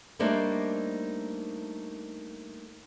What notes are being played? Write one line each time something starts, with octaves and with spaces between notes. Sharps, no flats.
G3 A3 A#3 D4 D#4 C5